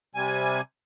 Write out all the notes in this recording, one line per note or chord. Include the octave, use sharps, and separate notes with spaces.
C3 G3 G#5